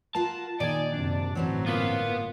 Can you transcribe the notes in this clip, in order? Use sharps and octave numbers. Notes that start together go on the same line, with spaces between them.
F4 F#4 A#4 A5
A#2 D#3 D#4 D5 G#5
F#2 C3 D4
G1 A2 E3 F#3 C4 C#4
A#3 B3 F4 B4